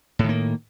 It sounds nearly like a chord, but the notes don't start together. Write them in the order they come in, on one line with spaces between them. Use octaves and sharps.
A2 D#3 A#3